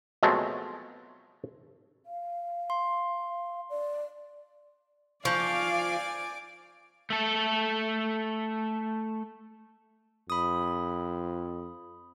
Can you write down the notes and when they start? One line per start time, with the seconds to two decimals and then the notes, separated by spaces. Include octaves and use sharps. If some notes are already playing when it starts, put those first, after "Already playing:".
0.23 B2 F3 F#3 G#3 A3 C4
2.06 F5
2.70 C6
3.70 D5
5.25 F3 D5 F5 G#5 C#6 D6 G6
7.10 A3 A4
10.30 F2 B5 D#6